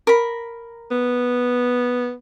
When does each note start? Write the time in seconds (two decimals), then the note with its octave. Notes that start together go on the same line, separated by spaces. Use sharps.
0.07 A#4 B5
0.91 B3